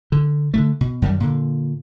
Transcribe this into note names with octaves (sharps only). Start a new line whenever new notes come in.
D3
D3 D#3 A3
B2
F#2 D#3 G3
A#2 D3